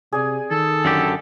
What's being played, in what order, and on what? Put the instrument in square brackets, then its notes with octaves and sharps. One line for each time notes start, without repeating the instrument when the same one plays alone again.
[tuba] C3 [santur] G#4 D5 G#5
[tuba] D#3 [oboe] A4
[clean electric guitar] F#2 D3 G4